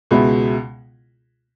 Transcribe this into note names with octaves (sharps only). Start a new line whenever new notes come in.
C#2 B2 G#3 B3 E4